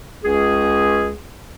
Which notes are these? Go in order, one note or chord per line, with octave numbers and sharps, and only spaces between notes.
C#2 C#4 G#4